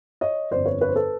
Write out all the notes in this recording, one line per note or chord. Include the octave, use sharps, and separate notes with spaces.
C#5 D#5
G1 F2 D3 C5 D5
B4 C#5
B4 C#5
C5
A4 B4